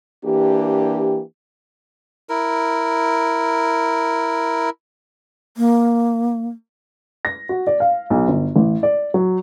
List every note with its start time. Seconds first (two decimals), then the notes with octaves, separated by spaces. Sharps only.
0.24 E3 A#3 D4 G4
2.29 E4 A#4
5.57 A#3
7.25 A#6
7.49 F#4
7.67 D5
7.80 F5
8.10 B1
8.28 G1
8.56 A1
8.83 D5
9.14 F#3